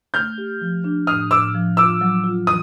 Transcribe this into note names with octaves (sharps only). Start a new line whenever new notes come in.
A3 F6 G6
G4
F3
D4
A2 D#6 F6
A2 D6 E6
F3
F4 D6 E6
F#3
F4
E3 D#6